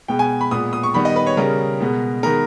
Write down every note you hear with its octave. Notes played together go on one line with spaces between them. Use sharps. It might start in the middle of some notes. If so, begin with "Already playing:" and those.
B2 G#3 B3 G5
G#5
B5
A#2 G#3 B3 D#6
D#6
C#6
D#3 G3 B3 B5
D#5
B4
C#5
C#3 G3 C#4 A#4
B2 G#3 B3
D#3 G#3 B3 A#4